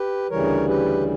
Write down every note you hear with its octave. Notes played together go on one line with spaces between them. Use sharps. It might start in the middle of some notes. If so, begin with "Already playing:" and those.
Already playing: G4 B4
D2 C#3 E3 G3 A#4 C#5
G4 B4